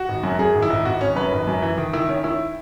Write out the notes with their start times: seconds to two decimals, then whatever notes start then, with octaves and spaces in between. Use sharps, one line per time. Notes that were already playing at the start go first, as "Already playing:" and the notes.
Already playing: F#4
0.09 G#1
0.24 F#2
0.39 F#2 G#4
0.55 G#1
0.62 E4
0.70 G#1
0.85 G#1 F#4
1.01 G#1 C#4
1.16 F#2 B4
1.32 G#1
1.47 F#2
1.62 E3
1.78 D#3
1.93 D#3 E4
2.09 D#3 C#4
2.24 D#3 E4